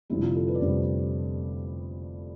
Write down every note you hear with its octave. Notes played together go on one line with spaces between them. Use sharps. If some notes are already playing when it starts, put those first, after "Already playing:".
F1 F2 D3 G3 E4
F4
A4
B4
D5
F1 F2 D3 G3 C5